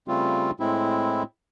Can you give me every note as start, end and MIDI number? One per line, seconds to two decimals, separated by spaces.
0.08 0.51 49
0.08 0.51 55
0.08 0.51 57
0.08 0.51 60
0.08 0.51 65
0.60 1.23 45
0.60 1.23 56
0.60 1.23 60
0.60 1.23 64